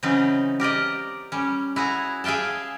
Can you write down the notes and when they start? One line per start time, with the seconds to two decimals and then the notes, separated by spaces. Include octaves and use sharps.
0.03 C#3 E3 F#3 C4 C#4 D#4
0.60 G4 A#4 D5 D#5
1.32 G3 C#4
1.76 E4 F#4 G#4 A#5
2.24 G#4 E5 F5 G5 A5